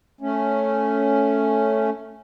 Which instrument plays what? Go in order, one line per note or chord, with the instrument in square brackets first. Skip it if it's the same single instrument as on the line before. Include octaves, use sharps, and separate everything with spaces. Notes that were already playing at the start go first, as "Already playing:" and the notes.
[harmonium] A3 C#4